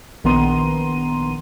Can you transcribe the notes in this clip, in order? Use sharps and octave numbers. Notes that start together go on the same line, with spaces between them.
A#1 D#3 B3 A#5 C6 D#7